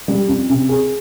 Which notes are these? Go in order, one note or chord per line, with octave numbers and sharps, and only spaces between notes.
G3
F2
C3
G#4